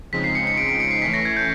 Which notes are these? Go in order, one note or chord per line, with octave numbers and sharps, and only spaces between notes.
C#3 F3 G#3 C4 D#4 B6
C7
C#7
C#7
D7
D7
C#7
C7
E3 A3 C#4 B6
A#6
G#6
G6